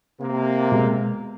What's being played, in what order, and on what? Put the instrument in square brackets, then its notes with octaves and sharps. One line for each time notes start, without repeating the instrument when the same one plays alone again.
[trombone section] C3 A#3
[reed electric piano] B2 G#3